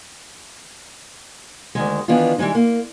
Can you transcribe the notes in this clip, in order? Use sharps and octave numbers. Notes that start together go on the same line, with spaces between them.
D2 G#2 D#3 G#3
D#3 E3 B3 D4 F4
E3 G3 G#3 C#4 D#4
A#3